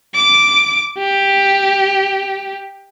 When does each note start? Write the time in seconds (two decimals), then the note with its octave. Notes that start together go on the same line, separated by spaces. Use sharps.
0.14 D6
0.98 G4